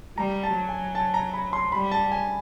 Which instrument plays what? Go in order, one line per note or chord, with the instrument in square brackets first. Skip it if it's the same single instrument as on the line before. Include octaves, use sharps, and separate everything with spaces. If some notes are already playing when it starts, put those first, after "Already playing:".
[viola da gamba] G3 [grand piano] A#5
[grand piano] A5
[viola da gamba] F#3
[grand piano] G#5
A5
A#5
B5
C6
[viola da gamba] G3 [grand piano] B5
[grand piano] A5
G#5